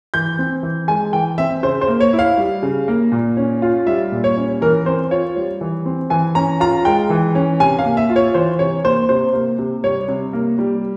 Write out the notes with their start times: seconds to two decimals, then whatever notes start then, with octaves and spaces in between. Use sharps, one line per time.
0.14 E3 G6
0.39 C4
0.63 E3
0.88 G#3 G#5
1.13 E3 G5
1.38 C4 E5
1.63 C#3 C5
1.81 C5
1.88 A#3
2.00 C#5
2.13 E4
2.19 F5
2.38 G3
2.63 C#3
2.88 A#3
3.12 A#2
3.37 C#4
3.62 F4
3.87 G3 E5
4.12 A#2
4.24 C#5
4.37 C#4
4.61 E3 A#4
4.86 C4 C5
5.11 F4 C#5
5.36 G3
5.61 E3
5.86 C4
6.10 E3 G#5
6.35 C#4 A#5
6.60 F4 A#5
6.85 G#3 G5
7.10 E3
7.35 C#4
7.60 C3 G#5
7.79 F5
7.85 A#3
7.97 E5
8.10 F4
8.16 C#5
8.34 E3 C5
8.59 C3 C#5
8.85 A#3 C5
9.09 C3 C5
9.34 A#3
9.59 C3
9.84 G3 C#5
10.08 C3
10.33 A#3
10.59 G3